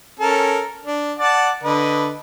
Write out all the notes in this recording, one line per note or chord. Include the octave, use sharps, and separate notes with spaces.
C#4 A4 A#4
D4
D5 F#5 A5
D3 B4 D#5